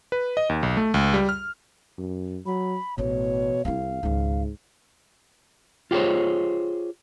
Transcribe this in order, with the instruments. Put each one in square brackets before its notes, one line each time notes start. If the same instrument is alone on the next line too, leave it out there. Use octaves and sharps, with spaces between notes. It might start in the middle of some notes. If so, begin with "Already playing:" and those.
[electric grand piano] B4
D#5
D#2
B1
A3
C#2
G3
F6
[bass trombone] F#2
[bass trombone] F#3 [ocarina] B5
[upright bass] A1 E3 [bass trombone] B2 [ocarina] C#5
[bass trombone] C2 [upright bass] C4 E4 [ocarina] F5
[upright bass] C#2 D#3 [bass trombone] G#2
[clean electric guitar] F4 G4 G#4 C5 C#5